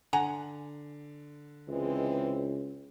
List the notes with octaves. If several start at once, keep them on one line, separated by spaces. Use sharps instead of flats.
D3 F#5 G#5 A#5
C#2 E3 G#3 C4